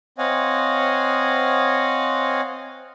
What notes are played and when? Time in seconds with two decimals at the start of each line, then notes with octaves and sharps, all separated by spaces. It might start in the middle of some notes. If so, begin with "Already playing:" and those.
0.18 C4 C#5 D#5 F5 F#5 G#5